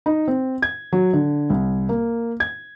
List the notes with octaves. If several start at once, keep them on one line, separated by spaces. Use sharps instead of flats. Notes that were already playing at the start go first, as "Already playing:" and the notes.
D#4
C4
G#6
F#3
D3
C2
A#3
G#6